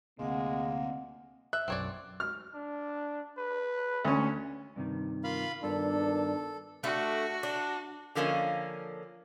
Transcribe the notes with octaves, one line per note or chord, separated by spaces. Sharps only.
D2 C3 G#3 A#3 C4 F#5
E5 F#6
B1 F#2 C4 C#5 D5
F6
D4
B4
D2 C#4
G2 C3 D#3
A#3 F4 F5 B5
G2 A#2 D#3 B3 D4 A4
A3 D4 F#4 A4
D4
D3 F3 A#3 C#4 D#5